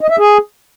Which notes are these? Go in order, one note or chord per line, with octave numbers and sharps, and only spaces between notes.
D#5
E5
G#4